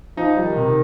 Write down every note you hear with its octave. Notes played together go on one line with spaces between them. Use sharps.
F3 D#4
G3
D#3
C3